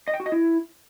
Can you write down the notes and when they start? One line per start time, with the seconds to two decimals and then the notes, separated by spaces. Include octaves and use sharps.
0.08 D#5
0.14 G5
0.20 F#4
0.26 D#5
0.32 E4